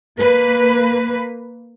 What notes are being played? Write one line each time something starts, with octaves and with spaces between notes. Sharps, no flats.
A#3 B4